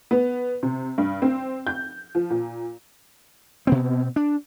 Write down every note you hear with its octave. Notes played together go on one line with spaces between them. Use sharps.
B3
C3
G2
C4
G6
F3
A#2
B2 B3 C4
D4